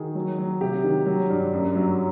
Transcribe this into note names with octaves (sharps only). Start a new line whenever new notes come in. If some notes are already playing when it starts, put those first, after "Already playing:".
Already playing: D#3 F#4 G#4
F#3
F#3
C3 G4
D#3
F#3
G2
F#2
F#3